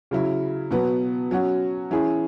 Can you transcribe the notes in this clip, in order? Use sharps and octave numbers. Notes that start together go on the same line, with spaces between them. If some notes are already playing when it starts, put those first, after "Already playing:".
C#3 F#3 E4
B2 F#3 B3
F#3 C#4 F#4
E3 C#4 E4 G#4